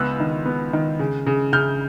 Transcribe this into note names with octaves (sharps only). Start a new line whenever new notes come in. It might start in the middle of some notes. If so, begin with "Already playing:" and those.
Already playing: C#2 B3 E6 F#6
D#3
B3
D#3
C#3
C#3
C#3 F6 G6